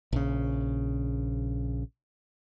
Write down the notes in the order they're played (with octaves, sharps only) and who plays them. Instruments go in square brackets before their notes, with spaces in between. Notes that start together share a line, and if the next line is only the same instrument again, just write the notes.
[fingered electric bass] A#1 C#3